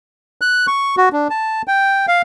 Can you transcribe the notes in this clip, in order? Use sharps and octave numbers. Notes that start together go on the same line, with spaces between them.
F#6
C#6
F#4
D4
A5
G5
F5